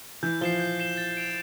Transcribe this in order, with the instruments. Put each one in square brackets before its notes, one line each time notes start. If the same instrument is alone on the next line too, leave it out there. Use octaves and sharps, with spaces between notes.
[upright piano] E3 [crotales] G6
[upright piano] F3 [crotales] C7 E7 G7
[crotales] G6
C7 E7 G7
A6
D7 F7